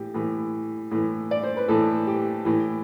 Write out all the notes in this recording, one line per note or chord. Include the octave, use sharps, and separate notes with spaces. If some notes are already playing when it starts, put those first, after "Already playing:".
Already playing: A2 E3 G4
A2 E3
A2 E3
D5
C5
B4
A2 E3 A4
G4
A2 E3